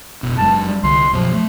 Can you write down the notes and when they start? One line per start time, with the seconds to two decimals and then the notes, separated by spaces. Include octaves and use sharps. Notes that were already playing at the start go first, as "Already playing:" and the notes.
0.23 F1 B2
0.37 F#1 F#2 G#3 A5
0.65 G3
0.83 C2 D3 C6
1.13 F#2 B2 F3 F#3
1.33 A3